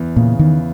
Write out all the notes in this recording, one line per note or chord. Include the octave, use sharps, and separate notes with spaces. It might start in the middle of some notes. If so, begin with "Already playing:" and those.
Already playing: E2 E3
A#2 C#3
E2 D#3